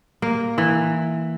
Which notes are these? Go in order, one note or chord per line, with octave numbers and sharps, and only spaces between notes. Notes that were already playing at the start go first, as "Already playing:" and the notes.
A#3
E3